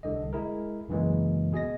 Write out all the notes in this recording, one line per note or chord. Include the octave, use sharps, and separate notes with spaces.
C2 D3 D#5
G#3 E4 G#4 A#4
B1 F#2 C#3 E3 G#3 A#3
B2 G#4 D#5 A#6